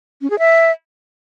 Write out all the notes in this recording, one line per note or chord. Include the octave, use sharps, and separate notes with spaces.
C#4
G#4
E5